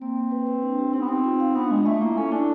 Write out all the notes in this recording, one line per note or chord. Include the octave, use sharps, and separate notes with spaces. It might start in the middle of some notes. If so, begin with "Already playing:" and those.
A#3 C4
A#3
B4
B4
D4
G4
C4 D#4
B3
C4 D#4
F4
F5
B3 D4
G#3 F4
A3 E5
A#3 E4
C#4 A4
D4 E4